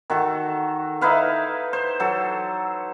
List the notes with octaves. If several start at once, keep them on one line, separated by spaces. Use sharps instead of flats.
D#3 F#4 A4
D#4 E4 B4 F5
C5
F#3 A4